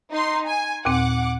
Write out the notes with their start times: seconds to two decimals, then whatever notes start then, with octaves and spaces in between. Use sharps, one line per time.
0.12 D#4 C6
0.47 G#5
0.85 D#2 A#2 C4 F#5 D6